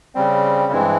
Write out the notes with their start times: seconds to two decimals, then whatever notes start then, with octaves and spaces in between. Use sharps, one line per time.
0.15 C#3 G3 C4
0.72 G2 E3 G#3 C4 E4